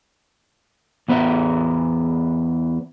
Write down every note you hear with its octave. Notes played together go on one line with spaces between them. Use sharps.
E2 B3 C5 E5